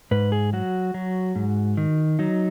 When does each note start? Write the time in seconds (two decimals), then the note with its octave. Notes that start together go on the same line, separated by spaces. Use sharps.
0.11 G#2 B4
0.32 G#4
0.53 F#3 F#4
0.94 F#3
1.36 G#2
1.77 D#3
2.19 F#3 D#4